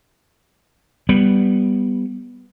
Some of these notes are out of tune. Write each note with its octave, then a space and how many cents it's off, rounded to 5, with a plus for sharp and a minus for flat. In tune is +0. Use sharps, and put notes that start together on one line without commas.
G3 +0 B3 +0